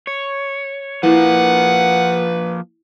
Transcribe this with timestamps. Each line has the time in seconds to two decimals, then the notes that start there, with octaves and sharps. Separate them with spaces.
0.07 C#5
1.03 F3 A#3 E4 B4 F#5